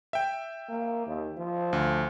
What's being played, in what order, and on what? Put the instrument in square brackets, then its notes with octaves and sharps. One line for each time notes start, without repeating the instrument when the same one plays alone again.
[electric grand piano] E5 G5
[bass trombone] A#3
D#2
F3
[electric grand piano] D2